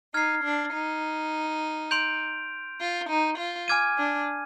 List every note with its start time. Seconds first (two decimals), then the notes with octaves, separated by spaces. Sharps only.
0.14 D#4 F6 G#6 C7
0.44 D4
0.73 D#4
1.91 C6 G6 D7 F7
2.80 F4
3.09 D#4
3.38 F4
3.68 G#5 D6 F6 G#6 D#7
3.98 D4